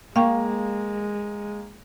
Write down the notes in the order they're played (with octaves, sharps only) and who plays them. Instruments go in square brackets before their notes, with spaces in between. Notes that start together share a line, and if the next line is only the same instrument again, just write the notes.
[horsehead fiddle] G#3 [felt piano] A#3 [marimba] F5 G5 C#6